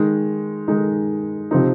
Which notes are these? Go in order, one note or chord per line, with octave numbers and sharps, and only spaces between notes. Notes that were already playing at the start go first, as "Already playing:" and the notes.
Already playing: D#3 G#3 D#4
D#3 G#3 D#4
C3 F3 C4 D#4